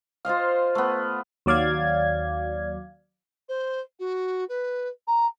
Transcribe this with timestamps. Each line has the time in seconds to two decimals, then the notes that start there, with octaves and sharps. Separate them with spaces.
0.25 F4 C5 D#5 F5
0.75 A3 B3
1.46 D#2 F#3 D5 F5 G#6
3.48 C5
3.99 F#4
4.49 B4
5.07 A#5